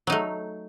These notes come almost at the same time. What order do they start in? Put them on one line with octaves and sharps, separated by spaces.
F#3 D#4 A3